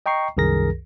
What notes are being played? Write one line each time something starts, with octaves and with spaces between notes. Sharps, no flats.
D#5 G5 A#5 C#6 C7
C2 F#2 D#3 G#4 A#4 A#6